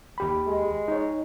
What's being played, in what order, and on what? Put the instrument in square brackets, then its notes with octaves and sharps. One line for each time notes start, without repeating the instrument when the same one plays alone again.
[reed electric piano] D#2 G4 B5
[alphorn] G#3
[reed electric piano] D#4 C#5